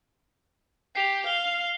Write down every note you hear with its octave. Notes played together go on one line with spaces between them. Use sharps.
G4 C7 F7
F5 G7